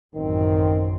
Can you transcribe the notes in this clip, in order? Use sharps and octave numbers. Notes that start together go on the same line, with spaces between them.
A1 F#2 D#3 C4